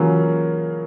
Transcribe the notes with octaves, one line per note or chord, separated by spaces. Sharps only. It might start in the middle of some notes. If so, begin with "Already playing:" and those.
Already playing: C#3 E3 F#3 A#3 C#4 F4